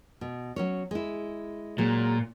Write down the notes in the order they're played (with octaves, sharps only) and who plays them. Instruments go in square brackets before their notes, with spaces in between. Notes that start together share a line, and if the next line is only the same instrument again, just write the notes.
[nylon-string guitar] B2
F#3 C#4 C#5
G#3 E4
[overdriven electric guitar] A#2 [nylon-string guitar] F#3 G#3